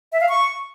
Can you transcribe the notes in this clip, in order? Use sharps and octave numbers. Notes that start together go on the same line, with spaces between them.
E5
F5
C#6